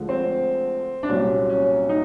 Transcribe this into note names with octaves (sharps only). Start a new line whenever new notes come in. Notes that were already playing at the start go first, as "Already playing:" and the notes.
Already playing: D2 D3 F3 G#3
C4
D4
C2 A#2 F#3 C#4
C#4
D#4